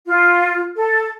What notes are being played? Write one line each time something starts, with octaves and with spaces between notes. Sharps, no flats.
F4
A4